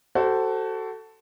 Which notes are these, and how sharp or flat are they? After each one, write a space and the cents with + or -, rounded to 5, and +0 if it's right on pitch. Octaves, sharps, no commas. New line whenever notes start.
F#4 +30 A4 +5 C5 +0